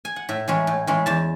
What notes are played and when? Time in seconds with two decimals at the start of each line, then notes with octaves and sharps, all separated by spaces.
0.05 G#5
0.16 F#5
0.29 A2 E5
0.48 E3 G#3 C#4
0.67 A2
0.87 E3 G#3 C#4
1.06 E2 A5